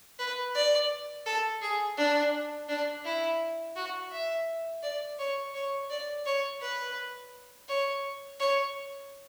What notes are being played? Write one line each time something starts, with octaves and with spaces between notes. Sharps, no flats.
B4
D5
A4
G#4
D4
D4
E4
F#4
E5
D5
C#5
C#5
D5
C#5
B4
C#5
C#5